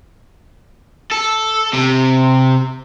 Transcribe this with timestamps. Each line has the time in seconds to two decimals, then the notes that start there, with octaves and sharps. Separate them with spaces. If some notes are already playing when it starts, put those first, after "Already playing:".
1.11 A4
1.73 C3